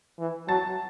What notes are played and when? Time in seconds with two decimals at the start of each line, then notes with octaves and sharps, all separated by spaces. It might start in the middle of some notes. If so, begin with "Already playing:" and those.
0.19 E3
0.48 F#3 A5 A6